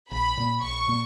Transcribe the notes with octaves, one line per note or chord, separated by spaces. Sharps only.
A#1 B5
A#2 A#3
A#1 C#6
A#2 A#3